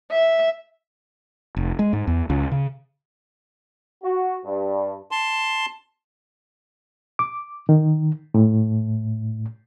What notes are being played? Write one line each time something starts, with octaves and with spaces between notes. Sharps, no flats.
E5
F1
G#3
G#2
E2
C#2
C#3
F#4
G2
A5 C6
D6
D#3
A2